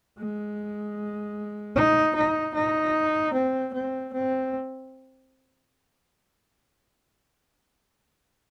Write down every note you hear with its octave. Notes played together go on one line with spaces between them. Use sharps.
G#3
D#4
D#4
D#4
C4
C4
C4